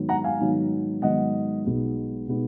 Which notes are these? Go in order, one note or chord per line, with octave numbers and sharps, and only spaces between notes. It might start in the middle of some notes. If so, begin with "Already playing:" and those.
Already playing: G#2 D#3 F#3 B3 D#4
F#5 A#5
F5 G#5
G#2 D#3 F#3 B3 D#4
G#2 D#3 F#3 B3 D#4 D#5 F#5
B1 B2 G#3 B3 D#4
B2 G#3 B3 D#4